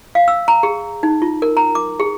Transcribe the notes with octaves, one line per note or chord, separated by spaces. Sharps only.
F5
E6
A#5
G#4
D#4
F4
A#4
A#5
D6
G#4